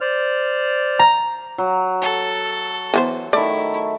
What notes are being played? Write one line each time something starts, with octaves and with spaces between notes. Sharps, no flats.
C5 D5 F6
A#5
F#3
A4
E3 B3 C5
D#3 A3 E4 D5